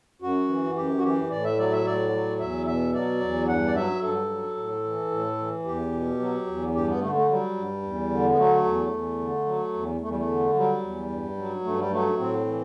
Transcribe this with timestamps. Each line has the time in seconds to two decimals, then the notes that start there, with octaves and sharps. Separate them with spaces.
0.22 F#2 F#4
0.48 E3
0.76 F#2 G4
0.98 F#4
1.03 E3 G4
1.30 A2 D5
1.44 E5
1.58 F#3 D5
1.72 E5
1.85 A2 D5
2.12 F#3
2.39 E2 E5
2.66 B2 E5
2.94 F#3 D5
3.21 E2
3.48 G2 F#5
3.66 D5
3.75 F#3 E5
4.02 G2 A4
4.30 F#3
4.57 A2
4.84 E3
5.11 A2
5.38 E3
5.65 E2 G4
5.92 B2
6.20 F#3
6.47 E2
6.74 G2 G4
6.87 B3
7.01 D3 A3
7.15 A3
7.28 F#3 G3
7.56 G2
7.82 E2
8.10 D3
8.32 B3
8.37 F#3 A3
8.64 E2
8.92 E2
9.19 D3
9.46 F#3
9.73 E2
10.01 E2 A3
10.09 G3
10.17 A3
10.27 D3
10.55 F#3 G3
10.82 E2
11.09 G2
11.37 F#3
11.64 G2 A3
11.78 G3
11.91 F#3 A3
12.18 A2 C4
12.45 E3